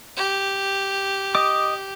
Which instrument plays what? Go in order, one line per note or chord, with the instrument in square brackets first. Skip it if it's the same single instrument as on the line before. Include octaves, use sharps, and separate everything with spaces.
[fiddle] G4
[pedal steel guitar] D#5 D6